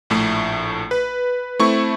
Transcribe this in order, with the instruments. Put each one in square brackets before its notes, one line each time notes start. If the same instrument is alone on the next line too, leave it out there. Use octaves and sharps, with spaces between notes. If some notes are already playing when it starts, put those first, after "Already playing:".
[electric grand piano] A#1 A2 A3
B4
A3 C4 E4 C#6